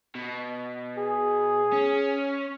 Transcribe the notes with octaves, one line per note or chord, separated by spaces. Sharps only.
B2
G#4
C#4